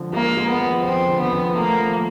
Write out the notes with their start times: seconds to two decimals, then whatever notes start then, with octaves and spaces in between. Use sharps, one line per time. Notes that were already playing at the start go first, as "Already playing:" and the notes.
Already playing: D3 F3 G#3 C4
0.13 G#3 A#3
0.37 G#3
0.49 B3
0.61 F3
0.84 F3 C4
1.08 D3
1.20 B3
1.32 F3
1.56 A3 A#3
1.80 F3